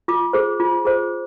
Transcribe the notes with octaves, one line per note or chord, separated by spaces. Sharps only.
F4 D6
G#4 C5
F4
G#4 C5